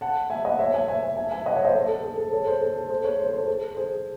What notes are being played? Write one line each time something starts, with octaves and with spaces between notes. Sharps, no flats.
F#5 A5
E5 G#5
D#5 F#5
C#5 E5
E5 G#5
E5 G#5
E5 G#5
E5 G#5
D#5 F#5
C#5 E5
C5 D#5
A4
A4
G#4
A4
A4 C#5
G#4 C5
A4
A4
G#4 C5
A4 C#5
C5
A4
G#4 C5
A4
G#4 C5